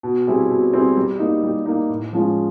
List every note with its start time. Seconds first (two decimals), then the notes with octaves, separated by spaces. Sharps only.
0.03 B2
0.27 G3 C4 E4 G#4
0.50 B2
0.73 G3 C4 E4 G#4
0.97 G3
1.19 A#3 D#4
1.43 G3
1.66 A#3 D#4
1.89 A2
2.13 F3 G#3 C#4 F4